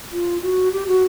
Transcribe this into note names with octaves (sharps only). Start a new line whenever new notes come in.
F4
F#4
G4
F#4